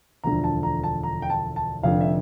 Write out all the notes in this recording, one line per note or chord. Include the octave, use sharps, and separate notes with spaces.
E1 D2 D3 F3 A#5
A5
A#5
A5
A#5
G5
A5
A5
F1 F2 D3 F5
E5